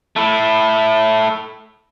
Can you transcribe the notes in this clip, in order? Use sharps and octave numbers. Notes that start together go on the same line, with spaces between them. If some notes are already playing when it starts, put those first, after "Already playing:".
A3 E4